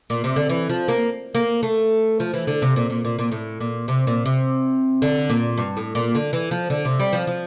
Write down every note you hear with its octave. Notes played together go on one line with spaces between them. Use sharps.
A#2
C3
D3
E3
F3
A#3
A#3
A3
F3
E3
D3
C3
A#2
A#2
A#2
A#2
A2
A#2
C3
A#2
C3
D3
A#2
G2
A2
A#2
D3
E3
F3
D3
C3
G3
F3
F3